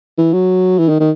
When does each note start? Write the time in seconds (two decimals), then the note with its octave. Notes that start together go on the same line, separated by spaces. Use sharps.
0.18 E3
0.33 F#3
0.79 E3
0.89 D#3
1.00 D#3